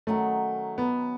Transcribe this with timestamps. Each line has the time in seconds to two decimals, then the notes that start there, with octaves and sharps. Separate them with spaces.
0.07 D#3 F#3 A3 C#4
0.78 B3